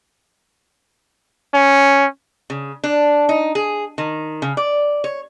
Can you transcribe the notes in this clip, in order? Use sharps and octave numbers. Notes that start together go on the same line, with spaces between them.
C#4
C#3
D4
D#4
G#4
D#3
C#3
D5
C#5